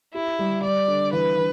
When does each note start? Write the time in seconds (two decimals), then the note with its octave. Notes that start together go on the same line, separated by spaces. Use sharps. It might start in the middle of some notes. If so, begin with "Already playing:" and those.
0.14 E4 G4
0.39 G3
0.63 G3 D5
0.88 D3
1.12 E3 B4
1.37 E3